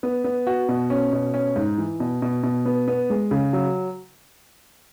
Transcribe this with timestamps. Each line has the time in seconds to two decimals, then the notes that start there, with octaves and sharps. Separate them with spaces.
0.03 B3
0.24 B3
0.47 F#4
0.69 B2
0.90 C#4
1.13 B2
1.34 C#4
1.56 G#2
1.78 E3
2.00 B2
2.22 B2
2.43 B2
2.66 B3
2.88 B3
3.10 G#3
3.31 C#3
3.53 F#3